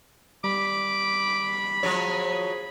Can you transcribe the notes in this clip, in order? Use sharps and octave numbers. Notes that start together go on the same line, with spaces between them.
G3 B5 D6
F3 F#3 G#4 C#5